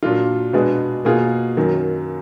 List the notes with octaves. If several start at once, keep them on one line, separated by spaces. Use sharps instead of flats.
A#2 F#3 D4 F4
B2 G#3 B3 D4 G#4
B2 A#3 F4 G#4
F#2 D#3 F#3